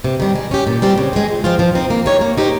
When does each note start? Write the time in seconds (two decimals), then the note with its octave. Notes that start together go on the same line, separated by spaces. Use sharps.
0.04 C3
0.20 D#3 G3
0.35 G#3
0.51 C#4 G4
0.67 A#2
0.82 G3 C4 G4
0.98 C#3
1.13 G#3 C4
1.29 A#2
1.44 F3 C4 F4
1.59 F3
1.75 C4 D#4
1.90 A#3
2.06 D#4 G4 C#5
2.21 A#3
2.38 D#4 G4 C5